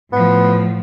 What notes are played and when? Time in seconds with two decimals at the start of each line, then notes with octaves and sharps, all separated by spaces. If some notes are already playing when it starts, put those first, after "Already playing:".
0.12 A2 F3 B3